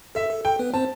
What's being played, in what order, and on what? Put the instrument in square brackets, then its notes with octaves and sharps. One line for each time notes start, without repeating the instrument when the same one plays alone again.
[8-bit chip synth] A4 [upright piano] E5
[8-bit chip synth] A4
[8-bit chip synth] A4 [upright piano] G5
[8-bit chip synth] B3 B4
[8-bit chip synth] C4 C5 [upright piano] A5